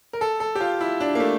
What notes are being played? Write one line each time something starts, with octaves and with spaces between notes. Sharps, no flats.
A#4
A4
A4
G4
F4
E4
D4
A#3
A3